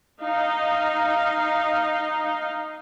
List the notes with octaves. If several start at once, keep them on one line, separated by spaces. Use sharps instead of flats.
D#4 F5